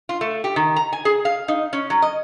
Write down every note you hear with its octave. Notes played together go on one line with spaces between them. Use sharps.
F4
A3
G4
D#3
A#5
G#5
G#4
F5
D#4
C#4
F#3
D#5